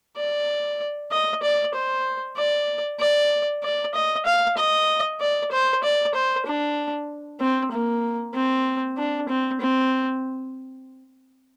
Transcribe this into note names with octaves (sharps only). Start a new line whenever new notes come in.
D5
D#5
D5
C5
D5
D5
D5
D#5
F5
D#5
D5
C5
D5
C5
D4
C4
A#3
C4
D4
C4
C4